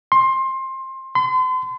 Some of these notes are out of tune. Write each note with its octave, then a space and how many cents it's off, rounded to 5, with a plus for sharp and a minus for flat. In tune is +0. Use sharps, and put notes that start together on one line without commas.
C6 +20
C6 -40